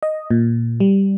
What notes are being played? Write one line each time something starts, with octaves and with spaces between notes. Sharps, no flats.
D#5
A#2
G3